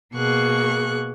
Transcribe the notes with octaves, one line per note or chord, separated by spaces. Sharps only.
B2 A#3 G#4 C#6 F#6